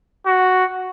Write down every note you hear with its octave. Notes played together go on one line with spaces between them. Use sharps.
F#4